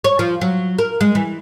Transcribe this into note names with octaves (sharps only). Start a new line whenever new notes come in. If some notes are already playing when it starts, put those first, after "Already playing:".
C#5
F3
F#3
A#4
G#3
E3